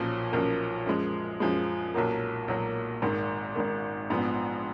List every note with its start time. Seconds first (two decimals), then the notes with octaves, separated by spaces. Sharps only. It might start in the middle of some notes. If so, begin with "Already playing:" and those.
Already playing: B1 A#2 F3 A#3 C#4
0.32 B1 A#2 F3 A#3 C#4
0.86 F#2 F3 G#3
1.40 F#2 F3 G#3
1.94 B1 A#2 F#3 A#3
2.48 B1 A#2 F#3 A#3
3.02 G#1 G#2 D#3
3.55 G#1 G#2 D#3
4.10 A#1 G#2 F3 B3